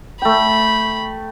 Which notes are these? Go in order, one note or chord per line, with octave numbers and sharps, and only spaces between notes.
A3 G5 B5